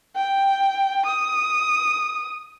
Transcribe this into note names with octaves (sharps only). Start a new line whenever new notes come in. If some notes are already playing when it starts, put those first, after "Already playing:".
G5
D#6